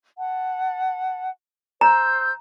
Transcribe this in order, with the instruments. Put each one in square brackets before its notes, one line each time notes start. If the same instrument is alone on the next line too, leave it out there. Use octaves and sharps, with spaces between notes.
[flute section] F#5 A5
[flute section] C5 E6 G6 [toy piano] A#5